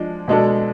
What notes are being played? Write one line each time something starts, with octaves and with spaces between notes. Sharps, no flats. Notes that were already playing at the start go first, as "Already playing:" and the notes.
Already playing: F3 G#3 D4
B2 G#3 D4 A4